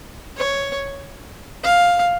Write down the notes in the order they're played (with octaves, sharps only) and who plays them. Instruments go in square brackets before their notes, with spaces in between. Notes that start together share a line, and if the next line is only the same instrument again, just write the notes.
[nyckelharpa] C#5
F5